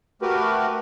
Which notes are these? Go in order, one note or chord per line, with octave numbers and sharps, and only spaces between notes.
A3 F#4 G4 A#4 B4